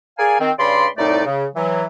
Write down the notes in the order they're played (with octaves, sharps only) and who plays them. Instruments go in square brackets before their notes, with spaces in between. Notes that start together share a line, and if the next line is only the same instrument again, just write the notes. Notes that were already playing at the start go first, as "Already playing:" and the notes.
[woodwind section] G#4 A#4 D5 F5 G#5
D#3 C4
G2 C#3 D5 B5 C6
C2 A2 A3 D#4 D5
C#3
E3 F#3